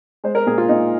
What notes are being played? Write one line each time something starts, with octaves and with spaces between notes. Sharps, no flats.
G#3 C5
A#4
A#2 G#4
F4
A#2 D#4